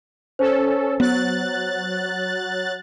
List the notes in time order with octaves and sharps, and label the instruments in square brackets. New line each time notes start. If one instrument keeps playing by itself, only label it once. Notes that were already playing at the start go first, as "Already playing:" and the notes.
[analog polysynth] C#4 A4 [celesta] C5
[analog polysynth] F#3 F#6 A6 [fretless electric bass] B3